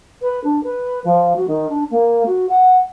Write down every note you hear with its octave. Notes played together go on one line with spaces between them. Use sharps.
B4
D4
B4
F3
F#4
D#3
D4
A#3
F#4
F#5